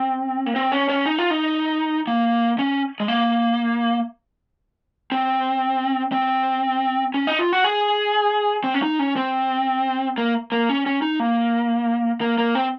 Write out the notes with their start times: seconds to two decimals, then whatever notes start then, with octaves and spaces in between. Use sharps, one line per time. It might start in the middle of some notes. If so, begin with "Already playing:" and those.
Already playing: C4
0.46 A#3
0.56 C4
0.72 C#4
0.89 C#4
1.06 D#4
1.19 F4
1.31 D#4
2.07 A#3
2.59 C#4
3.00 G#3
3.08 A#3
5.12 C4
6.12 C4
7.14 C#4
7.27 D#4
7.39 F4
7.53 F#4
7.64 G#4
8.64 C4
8.74 C#4
8.82 D#4
8.99 C#4
9.16 C4
10.18 A#3
10.52 A#3
10.69 C#4
10.86 C#4
11.02 D#4
11.20 A#3
12.21 A#3
12.38 A#3
12.55 C4